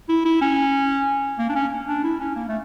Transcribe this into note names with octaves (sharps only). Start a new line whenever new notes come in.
E4
E4
C#4
A#3
D4
C#4
D4
E4
C#4
A#3
A3